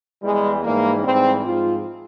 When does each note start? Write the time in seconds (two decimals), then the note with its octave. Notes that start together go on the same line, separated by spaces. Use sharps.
0.22 E2 E3 G3 G#3
0.63 G#2 E3 G3 A#3
1.04 G#2 E3 G3 C4
1.44 G#2 F3 F4